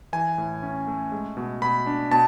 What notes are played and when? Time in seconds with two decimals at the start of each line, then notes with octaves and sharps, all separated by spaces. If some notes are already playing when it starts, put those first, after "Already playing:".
0.13 E3 G#5
0.38 A2
0.63 C#4
0.87 A3
1.12 G#3
1.37 B2
1.62 B2 B5
1.86 D4
2.11 B2 A5